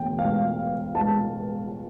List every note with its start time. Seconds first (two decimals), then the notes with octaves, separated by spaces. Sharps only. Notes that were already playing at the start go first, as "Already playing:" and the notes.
Already playing: E1 D2 G5
0.19 F5
0.95 A5